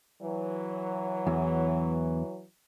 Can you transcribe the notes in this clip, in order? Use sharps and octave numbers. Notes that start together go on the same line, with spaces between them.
E3 F#3
E2